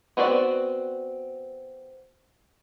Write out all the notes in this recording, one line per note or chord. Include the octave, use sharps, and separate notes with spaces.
B3 C4 F#4 G#4 D5